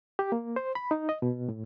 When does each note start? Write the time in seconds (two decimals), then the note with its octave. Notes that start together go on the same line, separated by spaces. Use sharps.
0.19 G4
0.32 A#3
0.56 C5
0.75 B5
0.91 D#4
1.09 D#5
1.22 B2
1.49 A2